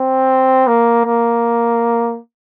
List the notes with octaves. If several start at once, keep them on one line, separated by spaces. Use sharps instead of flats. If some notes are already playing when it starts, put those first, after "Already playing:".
Already playing: C4
A#3
A#3